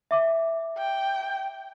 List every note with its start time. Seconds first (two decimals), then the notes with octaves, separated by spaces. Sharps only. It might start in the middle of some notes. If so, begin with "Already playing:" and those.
0.11 E5 D6
0.78 G5